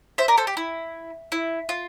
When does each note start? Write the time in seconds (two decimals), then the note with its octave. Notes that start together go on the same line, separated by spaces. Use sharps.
0.18 C5 E5
0.28 A#4 D5
0.38 A4 C5
0.47 G4
0.57 E4
1.32 E4
1.69 F4